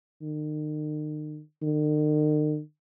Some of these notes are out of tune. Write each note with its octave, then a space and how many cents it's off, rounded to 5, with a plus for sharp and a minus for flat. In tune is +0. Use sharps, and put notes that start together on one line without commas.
D#3 -40
D#3 -45